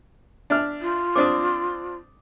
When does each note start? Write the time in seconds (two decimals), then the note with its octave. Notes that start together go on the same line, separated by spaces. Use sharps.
0.50 D4 E5 F6
0.82 F4
1.16 C4 D4 D6 D#6